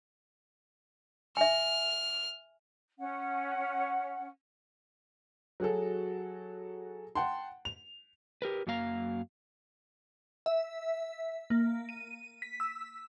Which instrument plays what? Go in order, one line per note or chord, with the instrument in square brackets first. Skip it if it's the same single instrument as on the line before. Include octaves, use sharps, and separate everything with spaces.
[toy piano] E5 G#5 [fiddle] F6
[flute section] C#4 F#5
[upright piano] F#3 F#4 G#4 A4
F#5 G5 A5 C6
F7
[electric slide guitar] G4 A#4 B4
F#2 F#3 A#3 F5 A#5
[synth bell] E5
A#3
D#7
B6
E6